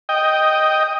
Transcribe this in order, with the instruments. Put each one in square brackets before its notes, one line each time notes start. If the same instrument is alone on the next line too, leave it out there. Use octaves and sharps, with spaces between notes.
[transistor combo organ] D#5 G5